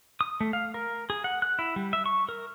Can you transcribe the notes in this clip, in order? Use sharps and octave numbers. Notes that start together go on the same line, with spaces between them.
D#6
A3
F5
A#4
G#4
F#5
F#6
E4
G3
E5
C#6
A#4